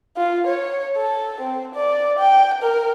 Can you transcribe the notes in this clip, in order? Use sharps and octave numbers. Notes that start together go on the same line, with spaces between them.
F4
C#5
A4
C4
D5
G5
A#4